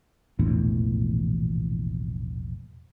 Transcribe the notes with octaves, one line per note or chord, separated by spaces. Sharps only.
E1 A#1 E2 A2